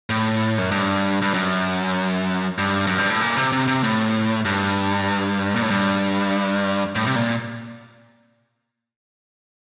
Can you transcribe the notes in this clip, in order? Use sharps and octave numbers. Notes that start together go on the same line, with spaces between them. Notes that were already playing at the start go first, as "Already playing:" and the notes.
A2
F#2
G2
G2
F#2
G2
F#2
G2
A2
A#2
C3
C3
C3
A2
G2
A#2
A2
G2
A2
C3
A#2